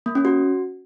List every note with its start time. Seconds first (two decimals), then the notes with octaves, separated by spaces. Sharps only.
0.06 A#3
0.15 C#4
0.25 F#4